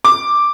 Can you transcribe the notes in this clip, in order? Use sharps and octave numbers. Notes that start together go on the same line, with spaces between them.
D6